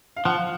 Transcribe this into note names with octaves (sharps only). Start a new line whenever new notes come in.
F5
F3 F#5